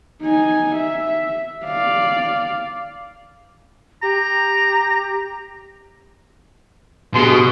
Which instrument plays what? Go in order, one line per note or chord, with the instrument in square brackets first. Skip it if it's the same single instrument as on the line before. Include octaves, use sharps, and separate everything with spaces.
[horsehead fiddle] D#4 G#5
E5
D5 F5
[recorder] G4 [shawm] A#5
[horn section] G2 G#4 C6 [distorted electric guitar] B2